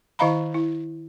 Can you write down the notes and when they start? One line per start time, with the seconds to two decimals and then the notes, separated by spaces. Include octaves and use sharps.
0.19 D#3 E4 D#5 F5 A#5 B5
0.54 E4